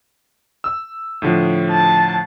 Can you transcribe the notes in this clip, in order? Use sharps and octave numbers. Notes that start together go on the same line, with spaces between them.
E6
A2 D3 F3
A5